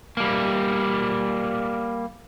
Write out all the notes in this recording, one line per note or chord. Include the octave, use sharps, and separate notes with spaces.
G3 A#3